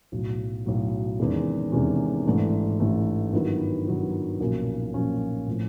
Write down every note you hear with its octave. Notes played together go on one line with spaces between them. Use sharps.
B1 A2 F#3
B1 A2 F#3
E2 C3 D#3 G#3 C#4
E2 C3 D#3 G#3 C#4
A1 G#2 E3 A3 D4
A1 G#2 E3 A3 D4
G2 D#3 F#3 B3 E4
G2 D#3 F#3 B3 E4
B1 A#2 F3 A#3 C#4
B1 A#2 F3 A#3 C#4
A2 F3 A3 C4